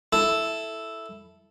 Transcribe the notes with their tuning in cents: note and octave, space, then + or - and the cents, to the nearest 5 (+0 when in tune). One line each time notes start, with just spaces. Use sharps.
E4 +0 A4 -5